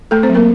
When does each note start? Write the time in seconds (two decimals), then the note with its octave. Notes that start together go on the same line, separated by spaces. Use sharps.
0.11 A3 A4
0.23 C4 C5
0.29 F#3
0.34 A#3 A#4